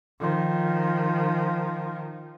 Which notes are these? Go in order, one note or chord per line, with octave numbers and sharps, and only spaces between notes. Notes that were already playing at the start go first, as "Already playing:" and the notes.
D#3 F3